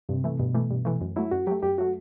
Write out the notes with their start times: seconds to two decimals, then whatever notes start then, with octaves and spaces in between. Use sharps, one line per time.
0.09 G2 C3
0.24 E3 A3
0.39 G2 B2
0.55 E3 A3
0.71 G2
0.85 E3 A3
1.01 F#2
1.16 F#3 A3 E4
1.31 F#2 F#4
1.47 F#3 A3 G4
1.62 F#2 G4
1.78 F#3 A3 F#4